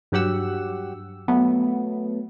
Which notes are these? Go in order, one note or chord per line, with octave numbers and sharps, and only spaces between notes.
G2 F#3 G4 F#5 E6
F#3 A3 B3